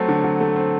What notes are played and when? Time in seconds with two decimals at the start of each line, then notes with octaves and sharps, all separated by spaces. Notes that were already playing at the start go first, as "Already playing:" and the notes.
Already playing: F#3 A3 C4
0.08 D3
0.24 F#3
0.40 A3
0.56 C4